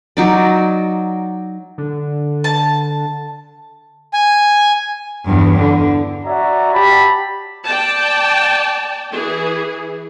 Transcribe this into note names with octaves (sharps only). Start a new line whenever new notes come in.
F#3 D#4 D5
D3
A5
G#5
E2 G2
D3
F#4 C#5 D5 E5 A#5
G4 A5 B5
D5 G5 A5
E3 G#4